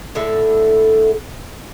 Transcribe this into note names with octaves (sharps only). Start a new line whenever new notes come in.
A2 D3 A4 E5